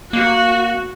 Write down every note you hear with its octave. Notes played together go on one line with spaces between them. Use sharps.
A#3 F#4